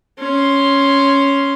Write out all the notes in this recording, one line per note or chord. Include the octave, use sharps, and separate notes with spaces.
C#4 C6